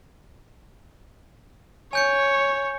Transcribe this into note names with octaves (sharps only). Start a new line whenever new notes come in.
C#5 G#5 G6 C#7